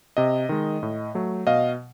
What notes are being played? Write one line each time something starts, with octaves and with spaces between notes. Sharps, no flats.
C3 D#5
D#3 G#3
A2
F#3 A3
B2 D#5 F5